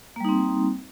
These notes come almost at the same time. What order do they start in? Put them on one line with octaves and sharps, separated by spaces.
A#3 G3 D#4 C4